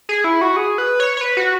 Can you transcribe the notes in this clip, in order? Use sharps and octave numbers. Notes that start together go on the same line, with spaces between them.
G#4
E4
F#4
G#4
B4
C#5
C#5
B4
F#4